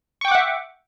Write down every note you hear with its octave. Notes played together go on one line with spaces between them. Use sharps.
E5 F#5 G5 C#6 D6